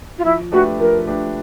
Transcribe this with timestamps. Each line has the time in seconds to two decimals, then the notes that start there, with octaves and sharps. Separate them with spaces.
0.19 F4
0.25 F3 E4
0.52 A3 D4 F#4 G4 B4
0.80 F3 A#4
1.07 A3 D4 G4 B4